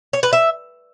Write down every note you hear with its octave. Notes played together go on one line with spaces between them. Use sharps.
C#5
B4
E5